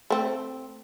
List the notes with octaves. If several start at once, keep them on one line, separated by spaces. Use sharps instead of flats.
A3 C4